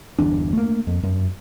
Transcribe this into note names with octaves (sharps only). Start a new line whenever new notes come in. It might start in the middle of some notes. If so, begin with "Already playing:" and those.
G1 E2 D4
A3 A#3
F2
F#2